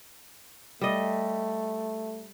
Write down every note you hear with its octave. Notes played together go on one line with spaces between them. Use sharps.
G3 A3 D#5